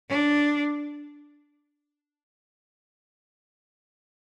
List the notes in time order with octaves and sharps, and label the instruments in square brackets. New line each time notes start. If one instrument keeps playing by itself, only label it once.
[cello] D4